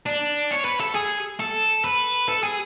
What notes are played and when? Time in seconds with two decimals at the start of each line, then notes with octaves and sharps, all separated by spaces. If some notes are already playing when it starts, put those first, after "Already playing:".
0.06 D4
0.51 C#5
0.65 B4
0.80 A4
0.95 G#4
1.40 A4
1.84 B4
2.28 A4
2.43 G#4